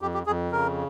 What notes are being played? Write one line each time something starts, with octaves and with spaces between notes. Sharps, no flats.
F2 G4
G4
F2 G#4
C#3 A#4